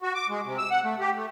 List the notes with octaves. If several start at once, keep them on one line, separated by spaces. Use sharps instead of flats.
F#4
D6
G#3
C3
E6
F#5
A3
G4
A3